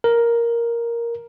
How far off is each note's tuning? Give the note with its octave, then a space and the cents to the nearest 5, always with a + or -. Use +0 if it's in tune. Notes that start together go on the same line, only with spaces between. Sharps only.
A#4 +5